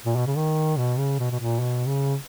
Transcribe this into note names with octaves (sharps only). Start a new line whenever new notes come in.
A#2
B2
C#3
D#3
B2
C#3
B2
B2
A#2
B2
C#3